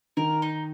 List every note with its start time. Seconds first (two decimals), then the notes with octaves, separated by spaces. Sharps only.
0.17 D#3 A#4
0.42 D#4